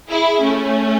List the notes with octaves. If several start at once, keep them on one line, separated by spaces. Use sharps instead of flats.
E4 G#4
A3 C#4